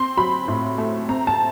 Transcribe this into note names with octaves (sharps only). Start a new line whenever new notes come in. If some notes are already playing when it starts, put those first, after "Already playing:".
Already playing: C4 C6
F#3 B5
A2
A3
C4 A#5
A5